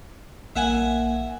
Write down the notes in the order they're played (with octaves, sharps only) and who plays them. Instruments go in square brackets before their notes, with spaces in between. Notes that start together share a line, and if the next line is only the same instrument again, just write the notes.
[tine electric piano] A#1 A#3 [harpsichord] E5 F#5 G#5